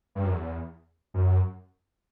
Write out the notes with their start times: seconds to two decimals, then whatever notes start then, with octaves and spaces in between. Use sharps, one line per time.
0.15 G2
0.24 F#2
0.32 E2
1.14 F#2